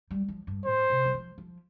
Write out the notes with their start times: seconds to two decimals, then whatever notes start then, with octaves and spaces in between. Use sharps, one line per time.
0.11 G3
0.28 F3
0.47 G2
0.65 A2 C5
0.90 C3
1.05 G3
1.14 F3
1.38 F3